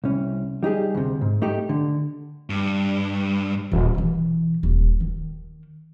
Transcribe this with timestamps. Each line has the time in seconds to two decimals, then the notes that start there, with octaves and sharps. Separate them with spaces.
0.04 C2 C#4
0.63 G3 D#4 G4 G#4
0.95 D2 C3
1.21 G#2
1.42 A3 D#4 G4
1.69 D3
2.50 G2
3.71 D#1
3.95 B2 E3
4.63 D#1
5.00 D#3